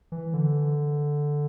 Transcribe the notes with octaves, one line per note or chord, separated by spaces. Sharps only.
E3
D3